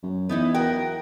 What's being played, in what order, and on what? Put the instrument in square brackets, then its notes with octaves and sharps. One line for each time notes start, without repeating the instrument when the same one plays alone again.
[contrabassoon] F#2
[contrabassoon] E2 [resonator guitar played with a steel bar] B3 D#4 E4
[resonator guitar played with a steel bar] F#4 A#4 [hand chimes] G5